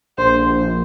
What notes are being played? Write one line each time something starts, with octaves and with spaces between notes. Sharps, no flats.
A#1 C5
A#1
A#1